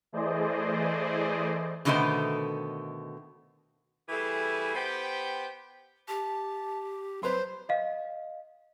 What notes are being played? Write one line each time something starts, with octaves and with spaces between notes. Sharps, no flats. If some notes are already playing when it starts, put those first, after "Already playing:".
E3 A3 G#4 C5 D5 D#5
B2 D3 D#3 A3 B3 C5
E3 G3 A3 E4 G#4
B3 G4 C5 G5
G4 A5
F#3 B4 C5 C6
D#5 F5